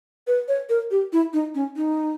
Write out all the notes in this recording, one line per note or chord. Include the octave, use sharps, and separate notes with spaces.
B4
C#5
A#4
G4
E4
D#4
C#4
D#4